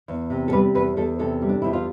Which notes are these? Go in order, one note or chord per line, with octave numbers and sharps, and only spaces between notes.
E2
C3
A4
G3 B4
E2 B4
E2 A4
C3 A4
G3
D4
E2 E4
F4